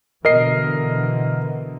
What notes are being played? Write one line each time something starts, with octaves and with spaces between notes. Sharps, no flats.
B2 D3 E3 A#4 D#5 C7